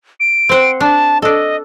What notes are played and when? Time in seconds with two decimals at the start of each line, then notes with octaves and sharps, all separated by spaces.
0.20 D7
0.49 C4 C5 F#5
0.81 D4 A5
1.22 D4 A4 D#5